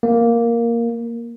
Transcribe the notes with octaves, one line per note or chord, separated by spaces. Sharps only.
A#3